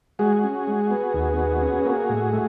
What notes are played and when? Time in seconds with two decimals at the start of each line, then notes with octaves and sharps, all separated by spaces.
0.19 G#3 F#4 G#4
0.44 C#4
0.67 G#3
0.91 B3
1.14 D#2
1.37 B3
1.61 C#4
1.85 A#3
2.09 A2
2.33 A3